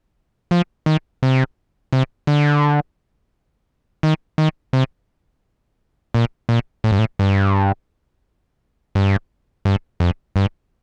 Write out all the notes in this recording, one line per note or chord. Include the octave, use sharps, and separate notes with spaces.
F3
D#3
C3
C3
D3
D#3
D#3
C3
A#2
A#2
A2
G2
A2
G2
G2
G2
F2
G2